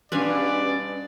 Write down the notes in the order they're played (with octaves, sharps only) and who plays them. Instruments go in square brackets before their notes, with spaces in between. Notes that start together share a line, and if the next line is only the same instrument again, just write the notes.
[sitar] G2 B2 [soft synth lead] C#4 [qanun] B4 F5 G#5 [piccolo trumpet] D5